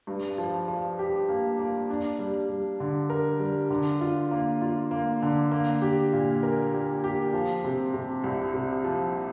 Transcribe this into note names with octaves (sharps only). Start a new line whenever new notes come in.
G2
F3
F3
G4
A#3
A#3
D4
G3
G3
D3
A#4
G3
D3
F4
A#3
F4
A#3
D3
A#3
G4
A#2
A#4
G4
G4
F3
C3
C3
C2
C3
F3